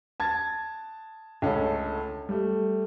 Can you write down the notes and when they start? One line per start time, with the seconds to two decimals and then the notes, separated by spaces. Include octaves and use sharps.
0.20 A5 G#6 A6
1.42 C#2 D3 A3 C#4 A4
2.29 G3 A3